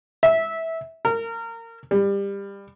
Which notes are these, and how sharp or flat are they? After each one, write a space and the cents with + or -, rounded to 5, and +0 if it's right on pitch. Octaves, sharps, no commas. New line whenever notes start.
E5 -15
A#4 -25
G3 +20